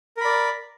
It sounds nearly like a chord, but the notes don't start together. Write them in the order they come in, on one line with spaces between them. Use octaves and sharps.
A#4 B5 D5